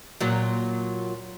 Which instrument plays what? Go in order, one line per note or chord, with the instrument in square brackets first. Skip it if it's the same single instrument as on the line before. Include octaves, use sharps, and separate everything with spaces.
[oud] A#2 F#3